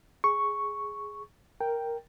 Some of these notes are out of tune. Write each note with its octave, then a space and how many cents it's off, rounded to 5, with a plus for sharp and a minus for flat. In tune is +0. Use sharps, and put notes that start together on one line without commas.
G#4 +0 C#6 +0
A#4 +0 G5 +0